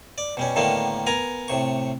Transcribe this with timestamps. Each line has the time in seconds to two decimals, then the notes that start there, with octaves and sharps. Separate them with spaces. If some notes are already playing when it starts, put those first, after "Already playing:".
0.18 D5
0.37 B2 G3 C#4
0.56 A2 D3 D#3 G3 A#3 B3
1.07 B3 A#4 G#5 A#5
1.48 A2 C3 C#6